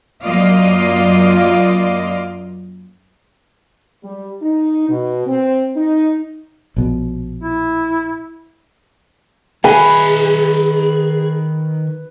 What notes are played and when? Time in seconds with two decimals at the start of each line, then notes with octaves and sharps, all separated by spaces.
0.24 F#2 A#3 F4 D5 D#5 F5
4.04 G3
4.42 D#4
4.89 B2
5.27 C4
5.76 D#4
6.76 A#1 B2
7.43 E4
9.64 D#3 G#4 B4 E5 G#5